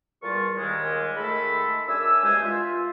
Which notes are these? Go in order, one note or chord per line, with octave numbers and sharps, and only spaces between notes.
E2 A#2 G3 F4 A5 C#6
D#2 A#2 D#3 G3 G#3
D#3 G#3 A3 A4 B5
F#2 D4 E5 G#5 E6
E2 G2 G#3 G#4 C5 G#5
F4 E5